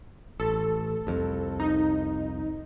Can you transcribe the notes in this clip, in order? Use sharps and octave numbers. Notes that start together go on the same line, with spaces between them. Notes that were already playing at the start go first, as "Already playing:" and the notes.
A1 A4
C2 F2
D#4